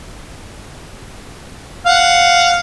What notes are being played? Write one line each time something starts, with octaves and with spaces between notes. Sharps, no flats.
F5 F#5